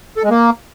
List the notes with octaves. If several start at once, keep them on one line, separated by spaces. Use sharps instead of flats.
A4
G#3
A#3